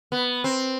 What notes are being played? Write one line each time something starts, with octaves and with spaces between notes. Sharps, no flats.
B3
C4